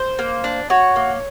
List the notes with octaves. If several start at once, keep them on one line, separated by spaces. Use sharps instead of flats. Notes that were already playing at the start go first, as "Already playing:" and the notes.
Already playing: C5
A#3
D4
F#4 C#5
A#3